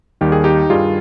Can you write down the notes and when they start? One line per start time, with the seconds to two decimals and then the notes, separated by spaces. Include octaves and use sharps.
0.21 D#2 D#3 G3 G4
0.32 G#4
0.44 D#4 G4
0.70 G2 D#3 G3 F4 G#4